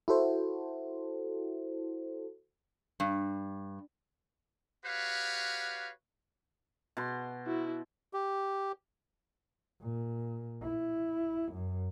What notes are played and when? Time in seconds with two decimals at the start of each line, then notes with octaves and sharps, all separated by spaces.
0.08 E4 F#4 A4 C5
3.00 G2
4.86 F#4 G4 B4 C#5 F5
6.97 B2 C6
7.47 E4 F#4
8.13 G4
9.81 A#2
10.62 E4
11.52 F#2